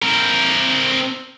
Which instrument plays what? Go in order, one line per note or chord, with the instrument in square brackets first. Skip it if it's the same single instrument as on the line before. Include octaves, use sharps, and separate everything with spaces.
[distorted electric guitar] C4 A#4